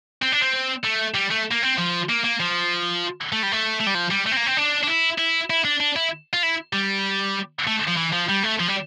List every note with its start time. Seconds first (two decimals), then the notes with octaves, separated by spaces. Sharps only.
0.22 C4
0.33 D4
0.42 C4
0.84 A3
1.15 G3
1.31 A3
1.51 A#3
1.63 C4
1.78 F3
2.09 A#3
2.24 A#3
2.40 F3
3.32 A3
3.43 G3
3.52 A3
3.80 A3
3.87 G3
3.95 F3
4.11 G3
4.26 A3
4.32 C4
4.37 A#3
4.46 C4
4.57 D4
4.83 D4
4.87 E4
5.18 E4
5.50 E4
5.65 D4
5.80 D4
5.96 E4
6.33 F4
6.43 E4
6.73 G3
7.67 A3
7.88 F3
7.97 E3
8.13 F3
8.29 G3
8.44 A3
8.60 F3
8.68 G3